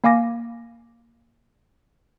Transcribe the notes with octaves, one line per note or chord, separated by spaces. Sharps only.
A#3 F5 G#5 D6 A#6